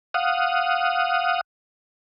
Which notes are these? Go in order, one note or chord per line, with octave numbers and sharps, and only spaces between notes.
F5 F#5 D#6